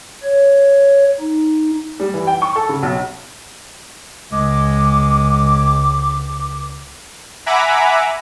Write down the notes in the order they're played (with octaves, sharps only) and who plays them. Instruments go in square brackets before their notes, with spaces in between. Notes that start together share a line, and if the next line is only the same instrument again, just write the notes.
[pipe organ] C#5
D#4
[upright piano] G3
E3
G5
C#6
A4
C#3
B1
[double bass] C#2 [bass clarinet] G#3 [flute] D6
[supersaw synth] E5 F#5 G#5 A#5 B5 D6